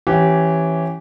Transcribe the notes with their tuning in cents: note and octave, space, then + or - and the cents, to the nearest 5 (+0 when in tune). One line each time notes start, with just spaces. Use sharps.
E3 +5 C#4 -10 G4 -15